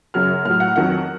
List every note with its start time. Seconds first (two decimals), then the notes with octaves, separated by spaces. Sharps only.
0.14 F#2 C#3 F#3 F6
0.45 A2 F#3 F6
0.60 F#5
0.76 F2 D#3 F#3 F#5